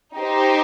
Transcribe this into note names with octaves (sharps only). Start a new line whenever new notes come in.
D#4 G4 C5